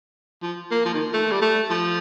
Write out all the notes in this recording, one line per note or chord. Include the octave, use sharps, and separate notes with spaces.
F3
A#3
F3
D#3
A3
G3
A3
F3